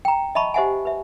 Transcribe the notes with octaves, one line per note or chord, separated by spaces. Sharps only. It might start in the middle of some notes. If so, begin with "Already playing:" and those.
G5 A#5
D#5 E5 A5 B5 C#6
G4 C5 D#5 E5 F#5 G#5
B4 E5